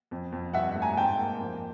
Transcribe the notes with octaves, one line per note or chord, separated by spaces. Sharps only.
F2
F2
G2 E5 F#5
A3
G#5 A#5
G#2 G5 A5
A#3
F2